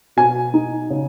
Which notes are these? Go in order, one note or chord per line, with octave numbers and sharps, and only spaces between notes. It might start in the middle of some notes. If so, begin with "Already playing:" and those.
B2 G#5
D#4
C#3